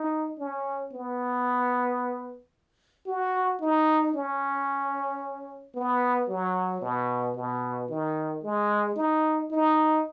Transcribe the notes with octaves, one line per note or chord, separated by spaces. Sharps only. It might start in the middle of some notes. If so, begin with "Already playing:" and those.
Already playing: D#4
C#4
B3
F#4
D#4
C#4
B3
F#3
B2
B2
D#3
G#3
D#4
D#4